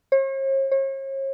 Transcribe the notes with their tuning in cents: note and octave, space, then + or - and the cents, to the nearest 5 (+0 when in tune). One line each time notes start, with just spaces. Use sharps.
C#5 -45
C#5 -40